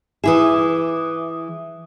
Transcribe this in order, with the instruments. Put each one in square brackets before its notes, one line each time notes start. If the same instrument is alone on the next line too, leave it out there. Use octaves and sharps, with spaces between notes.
[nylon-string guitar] E3 E4 G#4 [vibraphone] E5 D6 D#6